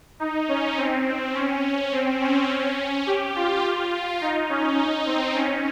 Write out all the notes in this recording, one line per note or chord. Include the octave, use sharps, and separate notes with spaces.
D#4
C#4
C4
C#4
C#4
C4
C#4
C#4
G4
F4
D#4
C#4
D#4
C4
C#4